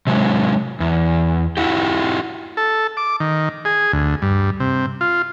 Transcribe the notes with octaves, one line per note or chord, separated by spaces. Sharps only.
C3 F#3 G#3
E2
E4 F#4 G4
A4
D6
D#3
G#4
D2
G2
C3
F4